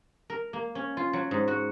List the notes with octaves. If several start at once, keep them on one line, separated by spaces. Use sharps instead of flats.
A#4
A#3
C#4
F4
F#3
G#2
F#4